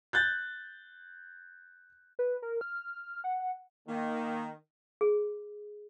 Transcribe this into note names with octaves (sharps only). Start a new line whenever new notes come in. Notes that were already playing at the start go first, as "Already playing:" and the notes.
F#6 G6 A6
B4
A#4
F6
F#5
D#3 A#3
G#4